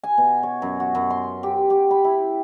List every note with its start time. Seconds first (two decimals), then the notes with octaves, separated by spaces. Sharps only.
0.03 G#5
0.18 B2
0.43 C#5
0.62 F#2
0.80 F#4
0.95 F#2
1.10 C6
1.43 G4
1.70 G4
1.91 B5
2.05 E4